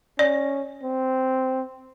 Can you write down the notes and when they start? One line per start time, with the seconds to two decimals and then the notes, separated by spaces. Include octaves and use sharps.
0.19 C#4 D5
0.83 C4